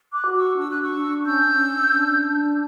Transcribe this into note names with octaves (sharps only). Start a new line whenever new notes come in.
D6 F#6
F#4
C#6 E6
D4 E6
F#6
C#6 E6
D4
C#4 E6 G6
C#4
D4
D4